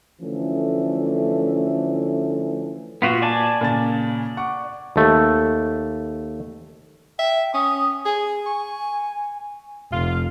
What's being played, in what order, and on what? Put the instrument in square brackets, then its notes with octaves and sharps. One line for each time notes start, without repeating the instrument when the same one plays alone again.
[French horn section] D3 E3 F3 A3 C#4
[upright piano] A#2 [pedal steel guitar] B3 F4 F#4
[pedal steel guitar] D5 G#5 A5
[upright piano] A#2 C#3 A6
F#5 C#6 D6
[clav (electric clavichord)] D#2 A3
[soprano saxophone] E5 [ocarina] G5
[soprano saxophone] C#4 [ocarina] D#6
[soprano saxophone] G#4 [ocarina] G#5
[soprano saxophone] C#6
[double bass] F1 [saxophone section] F4